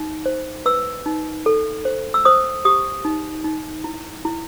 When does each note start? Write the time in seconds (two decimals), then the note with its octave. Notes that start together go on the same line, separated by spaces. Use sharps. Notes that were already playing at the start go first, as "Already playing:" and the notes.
Already playing: D#4
0.26 C5
0.66 B4 E6
1.06 D#4
1.46 A4
1.85 C5
2.14 E6
2.25 C5 D#6
2.65 G4 D#6
3.05 D#4
3.44 D#4
3.84 E4
4.25 E4